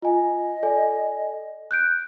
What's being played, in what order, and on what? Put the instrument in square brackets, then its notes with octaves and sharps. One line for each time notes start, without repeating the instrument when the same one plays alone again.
[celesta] F4 G#5 [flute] D#5
[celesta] A4 D5 G#5
F#6 G6 D7